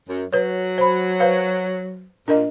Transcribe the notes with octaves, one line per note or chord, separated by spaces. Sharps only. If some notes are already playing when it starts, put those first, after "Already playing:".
F#2
F#3 B4 C#5
C5 B5
B4 C5 F5
A#2 D4 A#4 D#5